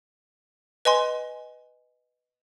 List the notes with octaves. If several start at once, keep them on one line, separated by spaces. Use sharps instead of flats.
B4 D#5 G#5 C6